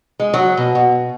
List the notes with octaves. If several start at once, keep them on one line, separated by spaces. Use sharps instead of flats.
G#3
F#3
B2
B2